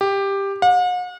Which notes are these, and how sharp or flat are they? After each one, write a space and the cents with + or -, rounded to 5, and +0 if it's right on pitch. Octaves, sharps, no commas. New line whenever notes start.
G4 +10
F#5 -45